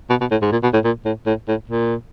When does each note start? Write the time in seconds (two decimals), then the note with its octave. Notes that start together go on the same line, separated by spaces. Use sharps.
0.10 B2
0.21 B2
0.31 A2
0.42 G#2
0.52 A#2
0.63 B2
0.73 A2
0.85 A#2
1.05 A2
1.26 A2
1.48 A2
1.69 A#2